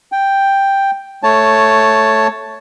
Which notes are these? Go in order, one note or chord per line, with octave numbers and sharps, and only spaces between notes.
G5
A3 C#5 A5